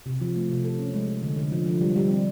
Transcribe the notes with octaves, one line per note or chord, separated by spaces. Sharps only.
C3
F3
A3
C3
A4
C#4
G#3
G#3
D3
D3
F3
F3
G3
G3
C4